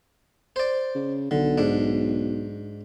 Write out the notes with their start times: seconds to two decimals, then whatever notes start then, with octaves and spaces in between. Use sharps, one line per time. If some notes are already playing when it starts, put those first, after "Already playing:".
0.56 C5 D5
0.95 C#3
1.31 B1 D3
1.58 G#2 D4